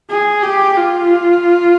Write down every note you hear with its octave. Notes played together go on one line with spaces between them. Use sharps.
G#4
G4
F4